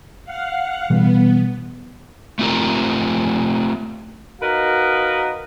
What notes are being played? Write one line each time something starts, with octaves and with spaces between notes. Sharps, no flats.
F5 F#5
B2 E3 G3 B3
A3 C4 F4 G4 A#4
D#4 F#4 A#4 B4 D#5 F5